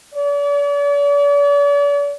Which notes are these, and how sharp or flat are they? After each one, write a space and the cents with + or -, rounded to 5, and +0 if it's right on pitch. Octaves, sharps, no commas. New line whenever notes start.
D5 -45